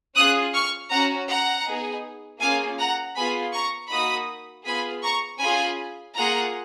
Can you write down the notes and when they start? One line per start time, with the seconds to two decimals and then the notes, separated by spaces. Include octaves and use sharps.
0.16 C#4 F4 G#4 D#6 F#6
0.54 C#6 F6
0.91 C#4 F#4 F#5 A#5
1.29 F#5 A#5
1.67 B3 D#4 G#4
2.41 A#3 C#4 F4 G#4 F5 G#5
2.79 F#5 A#5
3.16 B3 F4 G#4 G#5 B5
3.53 A#5 C#6
3.91 A#3 D#4 F#4 B5 D#6
4.66 B3 F4 G#4 G#5 B5
5.04 A#5 C#6
5.40 C#4 F4 G#4 G#5 B5
6.15 A#3 F4 G#4 F#5 A#5